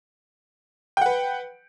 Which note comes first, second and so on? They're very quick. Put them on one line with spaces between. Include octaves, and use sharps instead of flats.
G5 F#5 B4